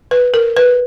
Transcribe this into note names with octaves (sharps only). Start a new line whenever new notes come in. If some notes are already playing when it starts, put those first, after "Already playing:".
B4
A#4
B4